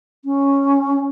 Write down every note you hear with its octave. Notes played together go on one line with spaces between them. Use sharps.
C#4